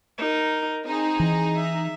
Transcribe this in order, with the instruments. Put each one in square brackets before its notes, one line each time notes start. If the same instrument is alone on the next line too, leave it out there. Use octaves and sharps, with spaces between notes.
[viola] D#4 A#4
[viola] C4 [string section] D#4 G#4
[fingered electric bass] E3
[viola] E5